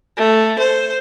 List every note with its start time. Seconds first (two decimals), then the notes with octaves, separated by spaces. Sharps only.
0.17 A3
0.58 C5